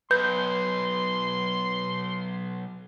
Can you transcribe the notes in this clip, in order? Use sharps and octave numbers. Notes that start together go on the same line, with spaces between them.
B1 B4 C6 G6